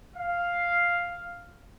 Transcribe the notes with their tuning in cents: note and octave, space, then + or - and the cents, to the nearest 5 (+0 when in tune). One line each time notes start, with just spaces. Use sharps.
F5 +0